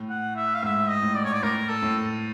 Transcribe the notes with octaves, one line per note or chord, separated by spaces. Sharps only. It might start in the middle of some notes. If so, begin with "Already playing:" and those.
Already playing: A2
F#5
E5
F5
G#2 E5
D#5
A2
D5
C#5
D5
A2 A#4
A4
A2